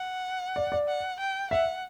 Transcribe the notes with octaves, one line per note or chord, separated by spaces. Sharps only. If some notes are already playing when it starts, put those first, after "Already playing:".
Already playing: F#5
D5
D5
F#5
G5
E5 F#5